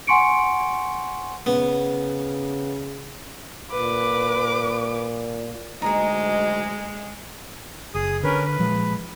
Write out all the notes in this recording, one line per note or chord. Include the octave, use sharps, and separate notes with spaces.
F#5 G#5 C6 C#6 C#7 D7
C#3 B3
A#2 B4 D6
D2 F#3 G#3 D#4 G#4 D#5
F#1 G#4 D#6
D3 C#4 A#4 B4
B4
A#2 F3 G#3